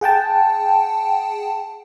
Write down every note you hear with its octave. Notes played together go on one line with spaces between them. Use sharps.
G#4 F#5 G5 A5